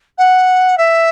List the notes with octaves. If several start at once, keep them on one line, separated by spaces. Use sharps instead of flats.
F#5
E5